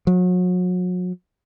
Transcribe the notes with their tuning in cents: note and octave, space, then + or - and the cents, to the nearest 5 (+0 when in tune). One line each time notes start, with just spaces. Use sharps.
F#3 -35